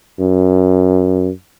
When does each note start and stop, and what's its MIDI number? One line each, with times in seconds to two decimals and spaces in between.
0.20 1.30 42